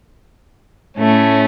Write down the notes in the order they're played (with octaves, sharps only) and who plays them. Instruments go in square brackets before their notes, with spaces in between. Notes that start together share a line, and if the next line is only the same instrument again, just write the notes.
[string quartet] A2 A3 C#4